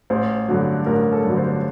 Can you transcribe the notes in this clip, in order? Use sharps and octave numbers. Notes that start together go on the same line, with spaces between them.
A1 C5
G2 D3 F#3
A1 A#4
A4
G2 D3 F#3
C5